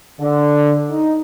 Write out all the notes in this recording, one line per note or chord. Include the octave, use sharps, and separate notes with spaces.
D3
D#4